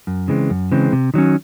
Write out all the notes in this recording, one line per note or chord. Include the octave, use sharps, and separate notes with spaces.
F#2
C#3 E3 G#3 C4
F#2
C#3 E3 G#3 C4
C3
D#3 F#3 C#4